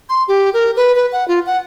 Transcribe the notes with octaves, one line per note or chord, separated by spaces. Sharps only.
C6
G4
A#4
B4
B4
F#5
F4
F#5